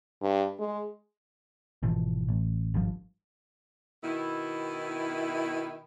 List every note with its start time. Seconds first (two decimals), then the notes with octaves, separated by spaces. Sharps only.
0.22 G2
0.59 G#3
1.83 G#1 B2 E3 F3
2.29 A1
2.74 G#1 G2 F3
4.04 B2 D#3 E4